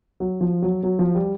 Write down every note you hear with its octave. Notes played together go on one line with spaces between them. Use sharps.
F#3
F3
F#3
F#3
F3
G3